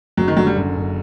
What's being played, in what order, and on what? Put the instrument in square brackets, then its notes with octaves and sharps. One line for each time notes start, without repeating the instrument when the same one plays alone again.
[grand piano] F#1 [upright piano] F#3
[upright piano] D#3
[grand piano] D3 [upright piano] F#3
[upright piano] G3
[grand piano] F#2
F#1